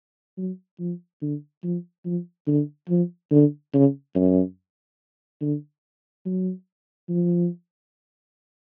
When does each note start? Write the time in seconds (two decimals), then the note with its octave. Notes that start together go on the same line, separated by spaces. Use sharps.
0.38 F#3
0.79 F3
1.22 D3
1.63 F3
2.05 F3
2.47 D3
2.89 F3
3.31 D3
3.74 C#3
4.16 F#2
5.41 D3
6.26 F#3
7.09 F3